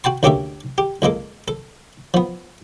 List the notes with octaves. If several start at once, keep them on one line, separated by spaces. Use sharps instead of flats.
F#4 G5 A5 C6
D2 A#3 C#4 G4 A4 E5
G4
C#2 G#3 A#3 A4
A4
F3 B3